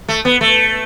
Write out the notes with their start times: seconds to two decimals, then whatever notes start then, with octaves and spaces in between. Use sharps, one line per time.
0.08 A3
0.25 B3
0.41 A3